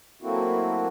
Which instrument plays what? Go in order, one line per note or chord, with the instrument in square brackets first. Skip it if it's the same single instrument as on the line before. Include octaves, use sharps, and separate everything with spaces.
[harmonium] F#3 A3 A#3 C4 E4 F#4